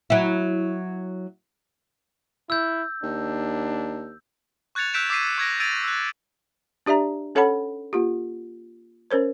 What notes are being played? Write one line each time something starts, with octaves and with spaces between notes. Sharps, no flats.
F#3 E4
E4 E6 G6
D#2 D4
C#6 F#6 G#6 A6 C#7 F7
E6 F#6 G6 B6 D7 E7
D6 E6 B6 C7 D#7
C#6 G#6 A#6 D7
E6 G#6 A6 D7 D#7 F7
E6 F#6
D4 G4 D5 E5 A#5
C#4 A4 C#5 F#5 A5 B5
A#3 F4 G4
C#4 A#4 C5 C#5